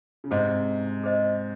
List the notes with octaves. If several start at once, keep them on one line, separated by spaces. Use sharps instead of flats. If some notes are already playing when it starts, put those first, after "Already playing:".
C#3
G#2 C3 G#4 C5 D#5
G#4 C5 D#5